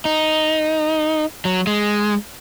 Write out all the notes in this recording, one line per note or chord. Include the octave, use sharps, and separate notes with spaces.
D#4
F#3
G#3